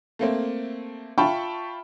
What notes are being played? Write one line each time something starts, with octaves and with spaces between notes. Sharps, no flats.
A3 A#3 C4
F4 E5 G5 A5 B5 C#6